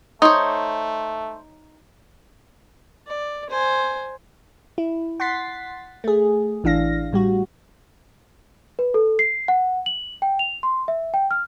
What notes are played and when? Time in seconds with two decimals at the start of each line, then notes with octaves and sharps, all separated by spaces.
0.22 A3 D#4 C5 C#5 D#6
3.07 D5
3.50 C5 G#5
4.78 E4
5.20 F#5 C6 A6 B6 C7
6.04 A3 G#4
6.64 A1 E3 D4 F5 A#6
7.13 A2 G3 F#4
8.79 B4
8.94 A4
9.19 C7
9.48 F#5
9.86 F#7
10.22 G5
10.39 F7
10.63 C6
10.88 E5
11.14 G5
11.31 F6